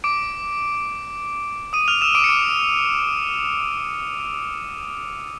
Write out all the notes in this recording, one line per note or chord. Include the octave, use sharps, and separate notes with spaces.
D6 D7
D#6 D#7
F6 F7
E6 E7
D6 D7
C#7
D6 D7